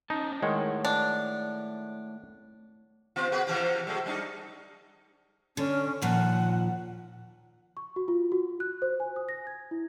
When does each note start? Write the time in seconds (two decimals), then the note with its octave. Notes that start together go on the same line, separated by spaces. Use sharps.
0.10 C#4 D#4 D#5 A5
0.42 D#3 G#3 A3 E4 C#5 F#5
0.85 D4
3.16 C3 B3 F4
3.32 F#4 G#4 B4
3.47 C3 E3 G4
3.87 F#3 A3 G#4
4.06 G3 D4 D#4
5.57 D3 C#4
6.02 D#2 A#2 F3 F#5
7.77 C#6
7.96 F#4
8.08 F4
8.32 F#4
8.60 F#6
8.82 C5
9.00 G#5
9.16 D#6
9.29 A#6
9.47 G#6
9.71 E4